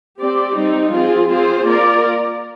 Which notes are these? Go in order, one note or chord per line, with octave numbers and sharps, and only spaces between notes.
C4 G4 D5
G3 C4 D#4
F3 C4 F4 G#4
C4 F4 G#4 C5
A#3 F4 A#4 D5